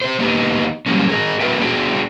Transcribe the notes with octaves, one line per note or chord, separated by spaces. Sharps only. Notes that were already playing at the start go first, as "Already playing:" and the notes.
G4 C5
A#3 B3 D#4 G4
F#3 G3 A#3 C#4
G#4 A#4 C#5 D#5
B3 F#4 A#4 B4 E5 G5
B3 D4 F#4 G#4 G5